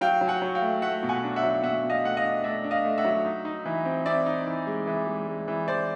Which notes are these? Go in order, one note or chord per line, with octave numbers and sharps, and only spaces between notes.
F#3 F5 G5
F#3
F#5 G#5
F#3
F5 G5
A3
A3 E5 F#5
B2
F#5 G#5
D4
E5 F#5
F#3
B2 E5 F#5
B2
D#5 F5
A3 F#5
D#5 F5
D4
A3 D5 E5
D4
D#5 F5
A3
E5 F#5
F#3
D#4
D#4
E3
C4
C4 D5 E5
D#4
E3
G#3
E3
G#3
G#3
E3
E3 C5 D5